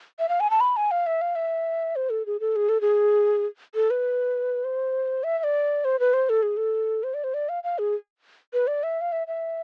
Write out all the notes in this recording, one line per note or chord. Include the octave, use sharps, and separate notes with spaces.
E5
F5
G#5
A5
B5
G#5
F5
E5
F5
E5
C5
A4
G#4
A4
G#4
A4
G#4
A4
B4
C5
E5
E5
D5
C5
B4
C5
A4
G#4
A4
C5
D5
C5
D5
F5
F5
G#4
B4
D5
E5
F5
E5
E5